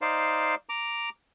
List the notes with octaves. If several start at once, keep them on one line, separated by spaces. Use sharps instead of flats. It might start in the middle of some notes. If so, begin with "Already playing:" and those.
D#4 C5 D5 F5
A#5 D6